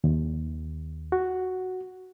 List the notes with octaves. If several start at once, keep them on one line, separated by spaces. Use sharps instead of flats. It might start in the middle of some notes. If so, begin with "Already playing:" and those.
D#2
F#4